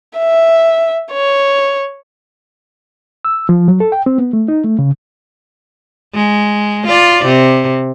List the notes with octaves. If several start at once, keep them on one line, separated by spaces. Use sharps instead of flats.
E5
C#5
E6
F3
F#3
A4
G5
C4
B3
A3
D#4
A3
C#3
G#3
F4 D5
C3